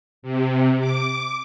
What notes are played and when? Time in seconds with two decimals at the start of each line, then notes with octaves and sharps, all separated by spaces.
0.23 C3
0.80 D6